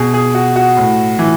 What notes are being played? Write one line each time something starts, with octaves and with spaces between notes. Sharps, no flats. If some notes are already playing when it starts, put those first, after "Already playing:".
Already playing: B2 G#4
G#4
F#4
F#4
A2
E3